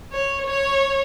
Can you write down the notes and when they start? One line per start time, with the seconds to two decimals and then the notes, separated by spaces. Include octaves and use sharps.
0.13 C#5
0.46 C#5